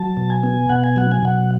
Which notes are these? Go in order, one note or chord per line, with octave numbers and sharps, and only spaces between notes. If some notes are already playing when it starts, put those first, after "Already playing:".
Already playing: F#3 A5
B2
G#5
B3
B2 F#5
G#5
F#3 F#5
G#5
B2 F#5